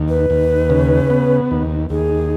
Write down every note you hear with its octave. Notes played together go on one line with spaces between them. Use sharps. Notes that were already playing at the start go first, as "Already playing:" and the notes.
Already playing: D#2
B4
D#2
C#3
B3
D#2
D#2 G#4